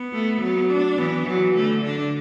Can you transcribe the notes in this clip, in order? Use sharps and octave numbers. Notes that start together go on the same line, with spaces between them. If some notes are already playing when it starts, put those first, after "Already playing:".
Already playing: B3
A3
F#3
D4
E3 B3
E3 F#3
D3 A3
D3 D4